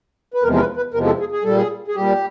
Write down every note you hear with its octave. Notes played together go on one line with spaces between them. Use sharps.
B4
E2 C3 F3 G#3 A#4
A#4
B4
B4
E2 C3 F3 G#3 A#4
A4
G#4
G#4
A#2 G3 A4
G#4
G#4
A#2 G3 G4